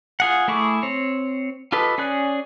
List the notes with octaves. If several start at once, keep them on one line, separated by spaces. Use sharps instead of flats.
F4 G#4 F#5
A3 E4 G#4 C#6 D6
C4 C#5
F4 G4 A4 B4 D#5
C#4 G#4 D5 F#6